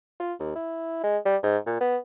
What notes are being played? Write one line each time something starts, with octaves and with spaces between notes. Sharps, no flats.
F4
D#2
E4
G#3
G3
G#2
A#2
B3